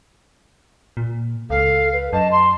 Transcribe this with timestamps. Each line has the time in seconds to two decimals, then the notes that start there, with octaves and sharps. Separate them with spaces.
0.97 A#2
1.50 C#2 A4 F5
1.92 B4
2.13 F#2 D#5 A5
2.31 C6